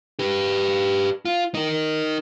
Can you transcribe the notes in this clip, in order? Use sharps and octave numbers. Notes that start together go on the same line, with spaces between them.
G4 B4
F4
D#4 A#4